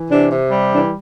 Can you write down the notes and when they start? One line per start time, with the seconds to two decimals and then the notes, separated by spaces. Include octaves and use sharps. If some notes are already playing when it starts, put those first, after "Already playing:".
Already playing: E3
0.09 C3 D4
0.30 C3
0.51 G3
0.72 E3 D4